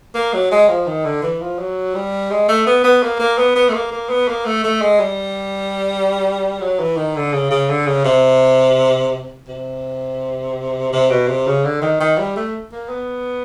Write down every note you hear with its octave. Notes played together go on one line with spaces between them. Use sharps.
A#3
F#3
G#3
F3
D#3
D3
E3
F3
F#3
G3
G#3
A3
B3
B3
A#3
A#3
B3
B3
A3
A#3
A#3
B3
A#3
A3
A3
G#3
G3
F#3
E3
D#3
D3
C#3
C#3
D3
C#3
C3
C3
C3
B2
C3
C#3
D3
D#3
D#3
G3
A3
A#3
B3